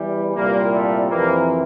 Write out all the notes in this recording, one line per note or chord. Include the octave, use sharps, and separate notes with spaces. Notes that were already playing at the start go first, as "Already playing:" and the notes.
Already playing: E2 E3 G3
C2 A#2 G3 A#3
A3
F2 C3 E3 A#3